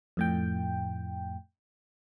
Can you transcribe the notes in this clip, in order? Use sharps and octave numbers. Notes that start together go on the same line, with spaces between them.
F2 A2 G5